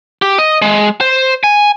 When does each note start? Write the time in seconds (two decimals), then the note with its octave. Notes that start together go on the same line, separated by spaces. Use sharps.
0.22 G4
0.38 D#5
0.62 G#3
1.01 C5
1.44 G#5